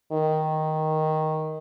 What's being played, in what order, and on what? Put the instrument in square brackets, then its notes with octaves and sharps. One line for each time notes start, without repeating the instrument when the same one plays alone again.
[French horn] D#3